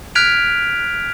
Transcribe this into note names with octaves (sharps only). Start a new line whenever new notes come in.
F6 F#6 G#6 B6 D7 F7